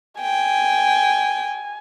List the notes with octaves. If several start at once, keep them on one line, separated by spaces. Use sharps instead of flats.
G5 G#5